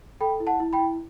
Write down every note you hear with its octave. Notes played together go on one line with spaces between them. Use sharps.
A4 G5 B5
E4
F#5 A5
E4
G5 B5
E4